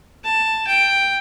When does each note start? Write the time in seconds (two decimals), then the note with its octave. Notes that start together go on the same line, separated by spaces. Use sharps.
0.24 A5
0.68 G5